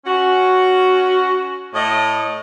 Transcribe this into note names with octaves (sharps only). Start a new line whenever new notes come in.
C#4 F#4
A2 D#5